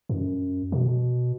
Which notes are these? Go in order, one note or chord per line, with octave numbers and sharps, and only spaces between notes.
F#2
B2